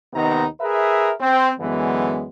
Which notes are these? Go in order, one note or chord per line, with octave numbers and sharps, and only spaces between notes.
D#2 C3 D#3 B3 D#4 A#5
G#4 A#4 B4 E5
C4
F#2 D3 E3 G#3 B3